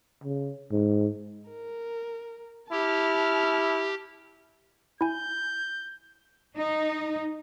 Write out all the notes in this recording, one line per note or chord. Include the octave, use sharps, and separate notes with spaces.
C#3
G#2
A#4
E4 G4 A5 F6
E4 G#5 G6
D#4